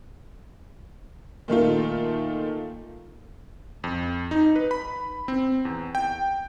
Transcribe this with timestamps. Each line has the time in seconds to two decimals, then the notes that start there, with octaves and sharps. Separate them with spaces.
1.48 A#2 D#3 A3 F4
3.84 F2
4.31 D#4
4.56 B4
4.71 B5
5.28 C4
5.65 E2
5.95 G5